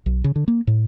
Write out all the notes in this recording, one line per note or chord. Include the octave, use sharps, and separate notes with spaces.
B1
C#3
D3
A#3
A2